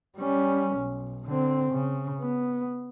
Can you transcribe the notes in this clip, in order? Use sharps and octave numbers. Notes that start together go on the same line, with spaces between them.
G3 C#4
B1
D3 C4
C#3
B3